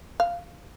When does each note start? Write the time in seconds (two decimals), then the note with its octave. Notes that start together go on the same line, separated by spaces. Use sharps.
0.20 F5